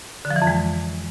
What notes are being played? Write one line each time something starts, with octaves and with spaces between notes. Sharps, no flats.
D3
F3
E3
F2
G#3